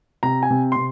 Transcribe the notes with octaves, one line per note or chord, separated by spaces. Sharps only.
C3 A#5
G#5
C3
C3 C6